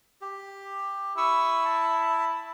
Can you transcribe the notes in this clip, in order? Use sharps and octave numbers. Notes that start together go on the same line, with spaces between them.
G4
E4 C#6 D#6 E6
A5